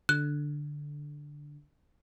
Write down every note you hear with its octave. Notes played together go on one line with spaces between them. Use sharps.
D3 F#6